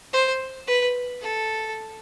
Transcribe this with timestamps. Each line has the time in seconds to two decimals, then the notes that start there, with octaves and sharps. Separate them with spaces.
0.13 C5
0.67 B4
1.22 A4